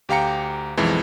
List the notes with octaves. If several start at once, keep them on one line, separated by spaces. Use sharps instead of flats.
D2 G4 F5 G5 A#5 C#7
B1 F2 E3 G#3